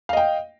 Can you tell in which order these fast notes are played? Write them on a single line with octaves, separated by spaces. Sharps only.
F5 D#5 G5